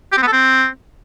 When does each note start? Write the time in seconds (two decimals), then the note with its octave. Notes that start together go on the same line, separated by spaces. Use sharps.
0.12 G4
0.17 C4
0.22 B3
0.28 A4
0.33 C4